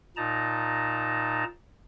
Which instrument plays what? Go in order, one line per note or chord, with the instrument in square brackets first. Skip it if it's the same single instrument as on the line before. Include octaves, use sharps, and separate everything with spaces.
[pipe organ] A#2 D#4 A5 A#5